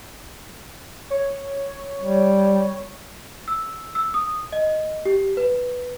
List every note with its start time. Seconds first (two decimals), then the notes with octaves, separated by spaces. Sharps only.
1.10 C#5
2.00 G3
3.48 E6
3.95 E6
4.14 D#6
4.52 D#5
5.05 G4
5.37 B4